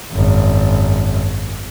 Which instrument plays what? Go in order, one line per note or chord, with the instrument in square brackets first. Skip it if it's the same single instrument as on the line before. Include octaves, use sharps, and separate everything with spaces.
[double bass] G#1 F#2